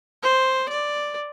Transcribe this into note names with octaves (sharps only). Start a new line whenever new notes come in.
C5
D5